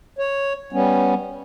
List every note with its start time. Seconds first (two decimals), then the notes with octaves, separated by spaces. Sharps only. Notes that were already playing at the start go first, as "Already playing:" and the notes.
0.19 C#5
0.73 G3 B3 C#4